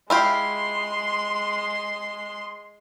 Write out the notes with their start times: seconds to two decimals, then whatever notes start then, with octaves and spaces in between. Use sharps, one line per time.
0.10 G#3 E4 F4 G4 C6